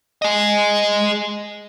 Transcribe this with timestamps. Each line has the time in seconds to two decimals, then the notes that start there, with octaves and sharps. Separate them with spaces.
0.22 G#4 D#5